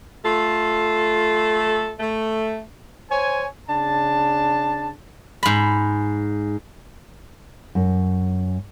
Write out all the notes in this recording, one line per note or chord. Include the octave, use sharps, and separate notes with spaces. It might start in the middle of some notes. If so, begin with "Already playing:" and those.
A3 F4 A4
A3
C5 C#5 G#5
C#3 D4 A5
G#2 B5
F#2